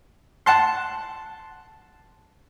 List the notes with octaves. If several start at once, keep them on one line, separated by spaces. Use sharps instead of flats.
F#5 A5 C6